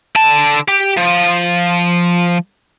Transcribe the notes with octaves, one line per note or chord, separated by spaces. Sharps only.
D3 A5
G4
F3